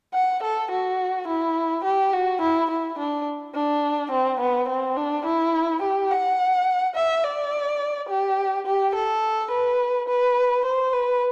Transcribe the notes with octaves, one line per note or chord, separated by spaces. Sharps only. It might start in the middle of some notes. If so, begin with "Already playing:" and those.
F#5
A4
F#4
E4
G4
F#4
E4
E4
D4
D4
C4
B3
C4
D4
E4
G4
F#5
E5
D5
G4
G4
A4
B4
B4
C5
B4